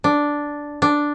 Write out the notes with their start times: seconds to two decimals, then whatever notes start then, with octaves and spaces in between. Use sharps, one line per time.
0.04 D4
0.82 D4